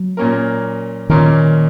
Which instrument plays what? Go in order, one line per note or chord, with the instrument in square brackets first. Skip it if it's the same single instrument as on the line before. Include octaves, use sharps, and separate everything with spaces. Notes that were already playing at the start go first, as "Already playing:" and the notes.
Already playing: [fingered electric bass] F#3
[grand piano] A#2 A#3 C#4 A#4
[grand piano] A#2 A#3 C#4 A#4 [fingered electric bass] D#3